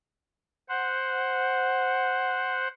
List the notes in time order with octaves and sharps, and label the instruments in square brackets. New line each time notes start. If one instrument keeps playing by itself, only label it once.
[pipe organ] C5 F#5